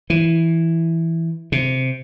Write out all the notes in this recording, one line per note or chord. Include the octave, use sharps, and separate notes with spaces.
E3
C3